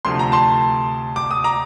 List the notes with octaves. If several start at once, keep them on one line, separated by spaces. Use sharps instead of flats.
D2 C3 F3 A3 C6
A#5
A5 C6
D6
D#6
A#5 D6